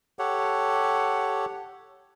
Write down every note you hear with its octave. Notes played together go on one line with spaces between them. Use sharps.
G4 A4 C#5 F#5